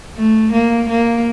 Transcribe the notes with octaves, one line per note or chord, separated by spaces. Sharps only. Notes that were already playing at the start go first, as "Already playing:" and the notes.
A3
A#3
A#3